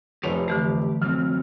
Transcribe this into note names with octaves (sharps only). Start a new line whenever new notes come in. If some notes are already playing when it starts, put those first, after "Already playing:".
F1 F3 G4 G#4 C#5 F7
D3 E3 A3 G4
F3 F#3 C4 F6